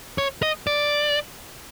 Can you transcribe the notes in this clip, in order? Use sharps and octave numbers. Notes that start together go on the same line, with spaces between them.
C#5
D#5
D5